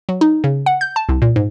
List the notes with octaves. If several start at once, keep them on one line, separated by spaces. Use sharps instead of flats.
F#3
D#4
C#3
F#5
G6
A5
C2
A#2
G#2